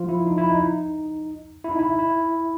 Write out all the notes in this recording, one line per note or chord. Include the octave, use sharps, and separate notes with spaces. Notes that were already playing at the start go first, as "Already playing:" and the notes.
Already playing: F3 F4
E4
D#4
E4
D#4
E4
D#4
E4
E4